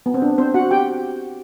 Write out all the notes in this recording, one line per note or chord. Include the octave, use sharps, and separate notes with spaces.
B3
C4
D4
C4 C5
F#4 F#5
G4 G5